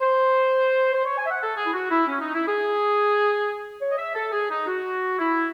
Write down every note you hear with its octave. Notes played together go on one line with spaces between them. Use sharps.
C5
C5
C#5
G#5
E5
F#5
A4
G#4
E4
F#4
E4
C#4
D#4
E4
G#4
C#5
D#5
E5
A4
G#4
D#4
F#4
E4